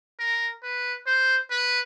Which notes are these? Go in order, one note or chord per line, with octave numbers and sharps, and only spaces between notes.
A#4
B4
C5
B4